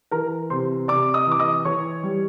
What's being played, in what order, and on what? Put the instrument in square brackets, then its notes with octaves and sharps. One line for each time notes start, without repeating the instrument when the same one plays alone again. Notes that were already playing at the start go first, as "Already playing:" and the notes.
[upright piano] E3 A#4 A#5
C3 C5 C6
C3 D5 D6
D#5 D#6
E3 D6
D#5 D#6
E3 C#5 C#6
G3